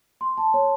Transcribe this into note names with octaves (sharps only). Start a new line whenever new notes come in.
C6
A5
C#5